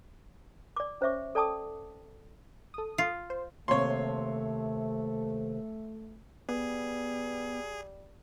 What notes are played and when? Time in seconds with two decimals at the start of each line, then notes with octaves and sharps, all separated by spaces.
0.76 D5 D6
1.01 C#4 C5 C#5 E5 C#6 D6
1.35 A4 D5 G5 A5 D6 D#6
2.74 A4 D#6
2.98 F4
3.30 C5
3.68 D#2 C3 A3 C#5 C6
6.49 G3 B3 G#4